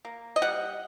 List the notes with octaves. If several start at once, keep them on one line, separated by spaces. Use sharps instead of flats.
A#3
D#5
G3 F#5